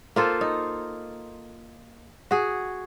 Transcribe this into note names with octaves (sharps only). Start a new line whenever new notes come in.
A#3 F4 A4 C5
D#4
F#4 G#4